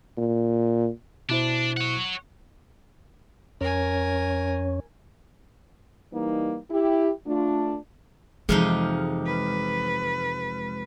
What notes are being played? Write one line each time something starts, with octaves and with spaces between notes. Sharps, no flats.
A#2
B2 D4 E4 C5
C#5 F#5
F2 C#4 A#4 C#5 G#5
E3 G3 A#3 D#4
E4 G4
A3 D4 F4
F2 C3 E3 G#3 D#4 F6
B4